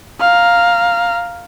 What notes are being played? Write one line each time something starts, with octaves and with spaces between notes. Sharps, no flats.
F5 A#5